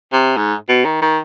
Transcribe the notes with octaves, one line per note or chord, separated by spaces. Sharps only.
C3
G#2
B2
D#3
D#3